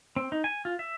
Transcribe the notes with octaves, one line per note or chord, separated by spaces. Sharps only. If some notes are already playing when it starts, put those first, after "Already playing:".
C4
D#4
G#5
F4
E5